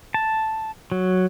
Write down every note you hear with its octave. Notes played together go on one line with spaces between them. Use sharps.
A5
F#3